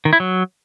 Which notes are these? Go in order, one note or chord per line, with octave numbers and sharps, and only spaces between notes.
D#3
E4
F#3